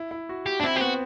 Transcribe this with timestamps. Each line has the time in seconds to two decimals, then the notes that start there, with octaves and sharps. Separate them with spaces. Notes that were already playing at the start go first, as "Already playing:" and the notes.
Already playing: E4
0.11 E4
0.29 F#4
0.46 G4
0.60 D4
0.63 C4 E4
0.76 C4 G4
0.81 B3 F#4